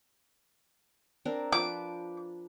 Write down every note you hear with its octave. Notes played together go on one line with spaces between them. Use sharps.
C4 D4 A#4
F3 B4 C5 D6